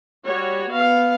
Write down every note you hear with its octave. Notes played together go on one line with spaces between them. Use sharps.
G3 F#4 C#5
B3 F5